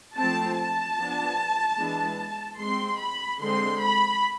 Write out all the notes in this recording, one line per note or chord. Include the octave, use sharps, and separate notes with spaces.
F3 A3 C4 A5
A5
F3 B3 D4
E3 G#3 B3 D4
G#3 C4 C6
B5
D3 G#3 C4 C6
B5